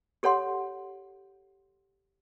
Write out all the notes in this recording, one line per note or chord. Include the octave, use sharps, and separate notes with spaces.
G4 A4 C#5 F#5 C6